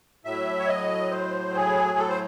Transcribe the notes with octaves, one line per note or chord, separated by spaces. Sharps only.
A2 F#3 E5
C#5
D#5
C5
G#4
A4
C5